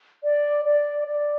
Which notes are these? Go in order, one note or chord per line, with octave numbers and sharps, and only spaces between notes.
D5
D5
D5